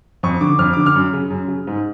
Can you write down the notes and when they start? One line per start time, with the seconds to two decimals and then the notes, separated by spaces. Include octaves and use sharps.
0.23 F2 C#6
0.41 D3 D6
0.59 F2 F6
0.73 D3 D6
0.86 F6
0.95 F#2
1.13 C#3
1.30 F#2
1.48 C#3
1.67 G#2